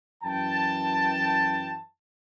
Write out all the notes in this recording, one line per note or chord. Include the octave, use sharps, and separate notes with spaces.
F#2 E3 G5 A5